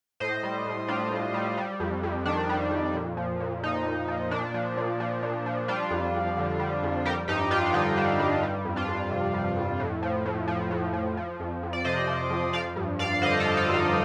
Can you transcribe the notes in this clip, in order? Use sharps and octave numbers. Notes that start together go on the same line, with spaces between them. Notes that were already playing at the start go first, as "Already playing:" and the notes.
A2 C5 D#5
G3
A2
G3 D4 F4
A2
G3
G3
F2
F2
D#3 D4
G3
F2
A#2
F3
A#2
F3 D#4
A#2
F3
A#2 D4
F3
A#2
F3
A#2
F3
G3 D4 F4
F2
F2
D3
G3
F2
G3 G4 A#4
G2 D#4 G4
G2 D4 F4
D4
D3 D#4
G3 D4
G2 D4
G3
F2
D4 F4
F2
C3
G3
F2
A2
F3
A2
F3
A2
F3
F3
F2
F2
D5
C3 C5 D#5
F3
F2
F3 D5 F5
G2
G2 D5 F5
D3 C5 D#5
A4 C5
F3
F4 A4
G2
D#4